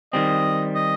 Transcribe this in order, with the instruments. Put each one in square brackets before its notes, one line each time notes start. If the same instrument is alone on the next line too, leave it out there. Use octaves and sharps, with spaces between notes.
[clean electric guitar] D#3 G3 C4 [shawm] D#5
[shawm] D#5